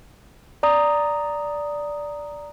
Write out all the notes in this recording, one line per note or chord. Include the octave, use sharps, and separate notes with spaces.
D5 A#5 D#6